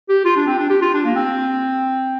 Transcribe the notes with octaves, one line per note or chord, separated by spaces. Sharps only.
G4
F4
D4
C4
D4
G4
F4
D4
A#3
C4